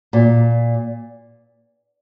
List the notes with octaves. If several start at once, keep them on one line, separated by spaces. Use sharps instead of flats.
A#2